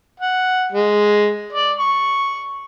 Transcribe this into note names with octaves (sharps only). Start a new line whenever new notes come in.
F#5
G#3
D5
C#6